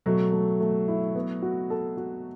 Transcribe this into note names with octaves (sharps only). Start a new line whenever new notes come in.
B2 F#3 A3
A3
A3
E4
B3
F#4
A4
F#4